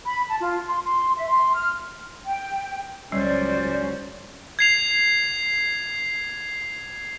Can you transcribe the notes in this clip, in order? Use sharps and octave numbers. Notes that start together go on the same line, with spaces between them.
B5
A5
F4
C6
C6
E5
C6
F6
G5
C#2 F#3 G3 C#4 C5 D5
G#6 C7 F7